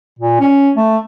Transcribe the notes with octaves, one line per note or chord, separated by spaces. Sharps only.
A#2
C#4
A3